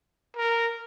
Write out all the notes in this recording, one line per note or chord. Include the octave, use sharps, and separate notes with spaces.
A#4